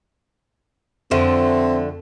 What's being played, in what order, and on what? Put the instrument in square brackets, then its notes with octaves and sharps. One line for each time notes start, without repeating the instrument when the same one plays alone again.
[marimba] F2 [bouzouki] D3 F3 A3 [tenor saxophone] C4